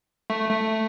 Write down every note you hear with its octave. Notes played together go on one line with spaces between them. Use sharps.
A3
A3